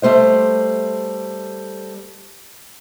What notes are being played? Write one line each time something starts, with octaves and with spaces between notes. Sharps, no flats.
G3 A3 C5 D#5